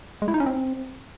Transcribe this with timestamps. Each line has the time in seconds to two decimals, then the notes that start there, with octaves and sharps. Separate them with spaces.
0.22 G#3
0.28 E4
0.34 D#4
0.40 C#4
0.46 C4